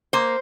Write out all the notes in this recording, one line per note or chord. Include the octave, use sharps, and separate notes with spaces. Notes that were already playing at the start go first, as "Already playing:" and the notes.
A#3 C5